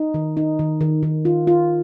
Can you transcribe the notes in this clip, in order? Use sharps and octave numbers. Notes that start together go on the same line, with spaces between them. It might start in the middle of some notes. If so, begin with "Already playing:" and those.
Already playing: D#4
D#3
D#4
D#3
D#3
D#3
F4
F4